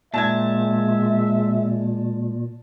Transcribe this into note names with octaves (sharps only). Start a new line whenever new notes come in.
A#2 G#3 E5 A5 G#6